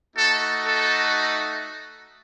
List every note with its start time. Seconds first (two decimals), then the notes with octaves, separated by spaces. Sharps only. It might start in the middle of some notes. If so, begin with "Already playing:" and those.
0.16 A3 D#4 F#4 A4
0.65 A4